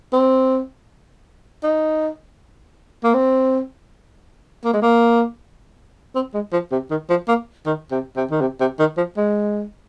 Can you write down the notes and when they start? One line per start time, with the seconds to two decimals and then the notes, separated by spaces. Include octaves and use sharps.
0.13 C4
1.63 D#4
3.04 A#3
3.14 C4
4.64 A#3
4.73 G#3
4.82 A#3
6.15 C4
6.34 G#3
6.52 F3
6.72 C3
6.91 D#3
7.10 F3
7.28 A#3
7.66 D#3
7.91 C3
8.16 C3
8.31 D#3
8.41 C3
8.60 C3
8.79 D#3
8.97 F3
9.17 G#3